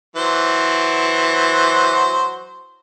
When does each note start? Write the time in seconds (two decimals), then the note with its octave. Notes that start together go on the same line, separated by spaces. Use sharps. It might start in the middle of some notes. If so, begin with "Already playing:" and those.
0.16 E3 F#3 C5